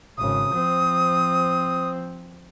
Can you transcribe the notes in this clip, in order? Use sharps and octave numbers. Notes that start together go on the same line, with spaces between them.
G#1 C#3 D#6
F3 C4